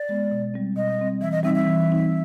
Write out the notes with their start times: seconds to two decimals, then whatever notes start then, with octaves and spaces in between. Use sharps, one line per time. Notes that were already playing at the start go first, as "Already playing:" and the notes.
Already playing: D5
0.09 G#3 B3
0.32 B2
0.54 G3 C4
0.76 B2 D#5
0.99 G3 C4
1.21 E3 E5
1.32 D#5
1.43 G3 C4 D#4 E5
1.55 E5
1.65 E3
1.89 G3 C4 D#4